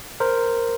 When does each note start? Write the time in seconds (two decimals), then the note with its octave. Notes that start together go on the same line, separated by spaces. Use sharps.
0.20 A#4 C5